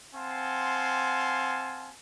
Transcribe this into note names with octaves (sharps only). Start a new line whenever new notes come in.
C4 F5 F#5 G#5 A5 C6